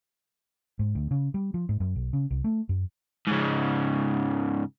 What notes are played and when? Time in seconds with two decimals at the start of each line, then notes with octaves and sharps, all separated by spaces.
0.79 G#2
0.95 D2
1.11 C#3
1.34 G3
1.54 F3
1.69 G#2
1.80 F#2
1.95 B1
2.13 C#3
2.31 C2
2.44 A3
2.69 F#2
3.27 G#2 C#3